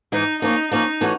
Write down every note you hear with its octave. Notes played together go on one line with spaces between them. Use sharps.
G#2 E3 G#3 D#4
F3 A#3 C#4 D#4
F3 A#3 C#4 D#4
E3 A3 C#4 F#4